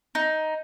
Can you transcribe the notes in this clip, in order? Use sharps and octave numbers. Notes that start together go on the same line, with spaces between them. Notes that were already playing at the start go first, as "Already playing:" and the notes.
D#4